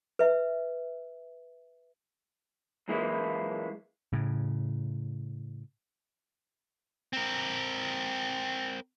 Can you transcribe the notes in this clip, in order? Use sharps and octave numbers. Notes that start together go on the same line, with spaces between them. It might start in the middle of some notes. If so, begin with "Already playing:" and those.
B4 E5
F#2 A#2 E3 G#3 A#3 E4
A2 C#3
C4 A#4